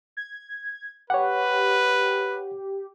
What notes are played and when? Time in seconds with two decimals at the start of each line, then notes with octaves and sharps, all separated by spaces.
0.17 G#6
1.10 G4 B4 C#5 F#5